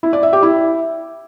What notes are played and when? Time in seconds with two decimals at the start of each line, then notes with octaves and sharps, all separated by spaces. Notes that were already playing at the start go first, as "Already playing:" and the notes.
0.03 E4
0.13 D5
0.23 E5
0.33 G4
0.43 E4